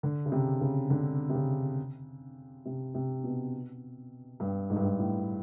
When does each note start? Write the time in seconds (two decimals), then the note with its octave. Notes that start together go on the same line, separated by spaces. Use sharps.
0.03 D3
0.26 C#3
0.32 C3
0.61 C#3
0.90 D3
1.30 C3
1.34 C#3
2.66 C3
2.95 C3
3.24 B2
4.40 G2
4.70 G#2
4.76 G2
4.84 G#2
4.99 A2